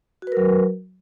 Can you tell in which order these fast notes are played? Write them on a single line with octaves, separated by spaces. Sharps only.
F#4 B4 A#4 F#3